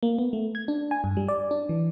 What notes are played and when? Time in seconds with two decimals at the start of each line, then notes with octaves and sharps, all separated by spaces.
0.03 A#3
0.19 B3
0.33 A3
0.55 G#6
0.68 D4
0.91 G#5
1.04 G2
1.17 G3
1.29 D5
1.51 D4
1.69 E3